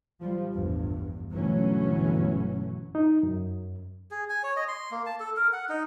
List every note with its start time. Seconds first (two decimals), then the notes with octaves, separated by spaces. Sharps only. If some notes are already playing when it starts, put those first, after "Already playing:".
0.21 F3 G3
0.53 A1 E2 G2
1.31 G1 B2 E3 F#3 A3 C#4
2.95 D#4
3.23 F#2
4.11 G#4
4.30 G#5
4.43 C#5
4.57 D#5
4.68 C6
4.91 A#3
5.06 A5
5.20 A4
5.37 A#4
5.53 F#5
5.69 D#4